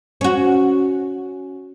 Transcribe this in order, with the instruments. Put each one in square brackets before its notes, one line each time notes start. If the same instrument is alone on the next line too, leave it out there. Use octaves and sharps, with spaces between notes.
[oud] C#4 F#4